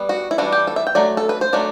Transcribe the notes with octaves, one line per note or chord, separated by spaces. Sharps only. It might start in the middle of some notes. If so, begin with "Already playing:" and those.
Already playing: G3 B3
F#4
E4
E3 G3 D4 F#4
G4
A4
E5
G5
F#3 A3 D5
A4
B4
C5
F#3 A3 D4 D5